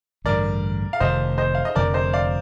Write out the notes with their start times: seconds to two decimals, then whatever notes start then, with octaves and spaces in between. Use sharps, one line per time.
0.24 A1 G2 D3 A#4 D5
0.93 F5
1.00 F1 F2 D#3 C5 D#5
1.38 C5 D#5
1.55 F5
1.65 D#5
1.75 F1 F2 D3 F3 A#4 D5
1.94 C5 D#5
2.13 D5 F5